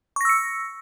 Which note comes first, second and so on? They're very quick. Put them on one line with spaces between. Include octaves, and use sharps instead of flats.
C#6 A#6 E6 C#7